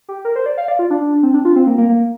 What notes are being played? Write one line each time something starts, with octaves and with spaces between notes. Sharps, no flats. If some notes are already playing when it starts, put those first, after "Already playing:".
G4
A#4
C5
D5
F5
D5
F4
D4
C4
D4
F4
C4
A#3
A#3
A#3